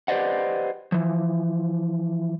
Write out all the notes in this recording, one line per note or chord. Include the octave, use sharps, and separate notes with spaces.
G4 B4 C5 D5 D#5 F#5
E3 F3